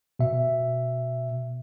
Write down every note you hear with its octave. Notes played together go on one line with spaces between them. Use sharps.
B2 E5